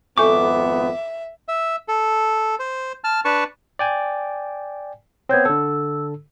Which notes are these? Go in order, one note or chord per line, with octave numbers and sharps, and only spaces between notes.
G#1 F2 B3 A4 E5 G#5 C#6 D6
E5
A4
C5
A5 F6
D4 B4 A5 C#6
D5 G5 G#5
B3 C4 C#5 G6 G#6
D3 A4 E6